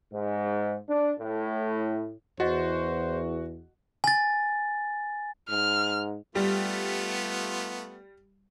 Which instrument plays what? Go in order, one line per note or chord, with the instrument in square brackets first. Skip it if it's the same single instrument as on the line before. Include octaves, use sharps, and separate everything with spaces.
[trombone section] G#2
D4
A2
[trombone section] E2 [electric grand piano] F#4 [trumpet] C5 [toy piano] D#5 F#5 C#6
[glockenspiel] G#5 A6
[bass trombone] G#2 [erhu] F6
[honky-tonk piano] G3 [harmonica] A3 B3 F4